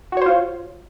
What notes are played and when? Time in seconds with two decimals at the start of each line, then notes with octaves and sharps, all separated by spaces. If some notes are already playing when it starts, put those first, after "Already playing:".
0.12 F#4
0.17 C#5
0.21 C5
0.26 F4